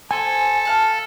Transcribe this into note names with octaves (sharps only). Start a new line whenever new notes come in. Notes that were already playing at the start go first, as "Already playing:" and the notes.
A4 C5 G#5
F5 F#5 A5